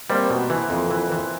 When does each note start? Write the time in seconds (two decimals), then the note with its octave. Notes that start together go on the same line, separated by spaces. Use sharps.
0.10 G3 A#3 C4
0.30 B2
0.50 E3
0.70 F2
0.91 E3
1.12 E3